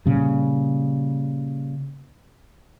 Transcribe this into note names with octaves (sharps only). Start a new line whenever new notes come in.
A#2 C#3 G3